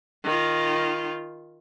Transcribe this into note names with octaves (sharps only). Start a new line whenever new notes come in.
D#3 F4